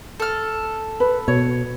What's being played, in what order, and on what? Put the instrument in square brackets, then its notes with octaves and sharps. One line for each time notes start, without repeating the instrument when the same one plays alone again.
[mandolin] A4 F6
[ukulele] B4
[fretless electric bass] B2 [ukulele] C#5